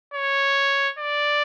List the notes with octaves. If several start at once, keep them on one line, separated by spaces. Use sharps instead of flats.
C#5
D5